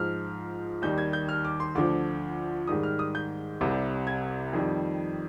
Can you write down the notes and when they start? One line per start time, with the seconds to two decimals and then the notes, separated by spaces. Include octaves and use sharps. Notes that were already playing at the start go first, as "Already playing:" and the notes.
Already playing: G#2 F3 F6
0.82 D#2 D#3 G3 G6
0.98 G#6
1.13 G6
1.29 F6
1.45 D6
1.60 C6
1.75 D2 D3 F3 D6
2.68 G#2 D#3 G3 D#6
2.83 F6
2.99 D#6
3.15 G6
3.61 C2 C3 G3
4.07 G#6
4.53 F2 D#3 G3